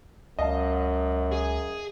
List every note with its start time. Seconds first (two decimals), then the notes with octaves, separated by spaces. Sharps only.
0.39 C#2 F#2 D#5 F5 A5
1.32 G#4